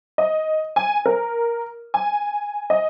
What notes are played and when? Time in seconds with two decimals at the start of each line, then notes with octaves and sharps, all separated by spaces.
0.18 D#5
0.76 G#5
1.06 A#4
1.94 G#5
2.70 D#5